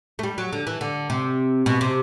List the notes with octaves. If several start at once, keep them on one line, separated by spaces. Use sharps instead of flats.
A3
G3
F#3
D3
E3
D3
C3
B2
C3